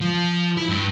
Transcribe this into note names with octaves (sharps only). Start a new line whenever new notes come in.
F3
E4
G2